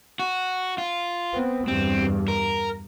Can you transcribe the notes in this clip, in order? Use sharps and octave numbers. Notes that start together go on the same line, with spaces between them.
F#4
F4
B3 C4
E2 G2 C4
A#4